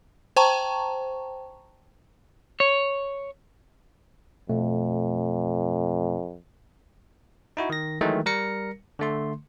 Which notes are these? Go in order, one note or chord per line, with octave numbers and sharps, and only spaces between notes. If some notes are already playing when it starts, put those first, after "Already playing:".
C5 G5 A5 A#5 C#6
C#5
F2 B2 A3
D#4 E4 F#4
D#3 A#6
D#3 E3 F#3 G#3 A3
G3 A#4 A#6 C#7
D3 A3 C6